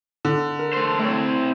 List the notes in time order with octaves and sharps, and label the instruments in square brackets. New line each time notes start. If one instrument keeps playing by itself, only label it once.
[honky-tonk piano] D3
[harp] A#4
[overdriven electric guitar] A3 C5
[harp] A3 C#5 [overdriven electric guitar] C4 E4